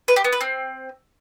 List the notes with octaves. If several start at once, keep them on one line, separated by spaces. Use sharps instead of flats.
B4
G4
B3
B4
C4